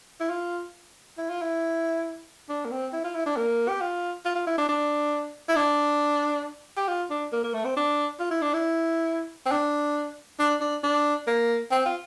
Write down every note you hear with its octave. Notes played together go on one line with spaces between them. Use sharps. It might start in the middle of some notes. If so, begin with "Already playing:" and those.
E4
F4
E4
F4
E4
D4
A#3
C4
E4
F4
E4
D4
A#3
G4
F4
F4
F4
E4
D4
D4
E4
D4
G4
F4
D4
A#3
A#3
A3
C4
D4
F4
E4
D4
E4
C4
D4
D4
D4
D4
A#3
C4
F4